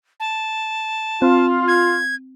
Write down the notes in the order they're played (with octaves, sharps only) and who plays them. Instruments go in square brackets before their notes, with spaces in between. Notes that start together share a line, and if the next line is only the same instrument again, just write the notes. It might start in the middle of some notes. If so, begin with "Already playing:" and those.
[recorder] A5
[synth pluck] C4 [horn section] F4
[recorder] G#6